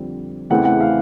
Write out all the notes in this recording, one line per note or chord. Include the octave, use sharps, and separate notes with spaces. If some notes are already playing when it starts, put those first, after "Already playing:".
Already playing: F2 D3 G3 C4
E2 C#3 E3 A3 C4 F#5
F#5
F5